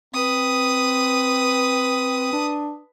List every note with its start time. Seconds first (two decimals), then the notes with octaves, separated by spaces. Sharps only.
0.14 C4 B4 D#6
2.33 D4